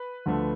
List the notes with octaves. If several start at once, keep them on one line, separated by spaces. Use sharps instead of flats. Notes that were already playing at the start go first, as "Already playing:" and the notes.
Already playing: B4
D2 D3 F3 A3